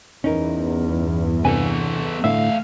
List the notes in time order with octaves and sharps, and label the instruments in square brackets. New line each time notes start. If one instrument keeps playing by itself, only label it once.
[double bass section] E2 G2 [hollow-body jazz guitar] C#4 D#4 A#4
[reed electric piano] C3 E3 D4 [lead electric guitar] B3 A4 [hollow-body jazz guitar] G#5
[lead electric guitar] D2 F5 [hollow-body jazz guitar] A2 D3 [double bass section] A3 [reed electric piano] E5